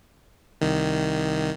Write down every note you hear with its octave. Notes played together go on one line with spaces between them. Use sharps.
C2 D#3